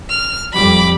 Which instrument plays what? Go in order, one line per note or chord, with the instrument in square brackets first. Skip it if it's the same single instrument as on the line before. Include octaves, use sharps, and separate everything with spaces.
[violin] F6
[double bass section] F2 G3 [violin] B5 D6